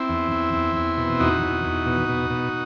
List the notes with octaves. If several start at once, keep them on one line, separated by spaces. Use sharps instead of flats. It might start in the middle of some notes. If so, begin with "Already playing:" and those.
Already playing: C4 E4
E2
E2
E2
E2
B2
E2 D#4 F#4
E2
E2
B2
B2
B2